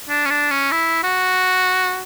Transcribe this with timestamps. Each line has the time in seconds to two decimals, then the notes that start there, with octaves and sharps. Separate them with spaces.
0.09 D4
0.25 C#4
0.30 D4
0.51 C#4
0.72 E4
1.03 F#4